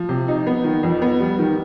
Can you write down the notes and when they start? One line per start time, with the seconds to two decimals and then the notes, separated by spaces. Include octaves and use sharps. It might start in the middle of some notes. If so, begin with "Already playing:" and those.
Already playing: F3
0.09 C3
0.28 D#4
0.47 B3
0.64 D#3
0.83 F2
1.02 B3
1.20 G3
1.39 D#3